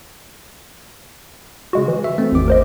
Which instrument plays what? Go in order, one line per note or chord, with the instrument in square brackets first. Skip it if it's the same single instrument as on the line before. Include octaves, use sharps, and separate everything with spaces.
[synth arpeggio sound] C#3 G#3 F#4
E3
[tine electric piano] E5
A3 C4
G#1 E2 D6
[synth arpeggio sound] A#4 C5 D#5